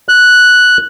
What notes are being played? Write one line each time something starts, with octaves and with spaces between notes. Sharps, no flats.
F#6